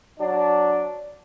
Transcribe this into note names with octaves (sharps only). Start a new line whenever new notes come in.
F#3 D4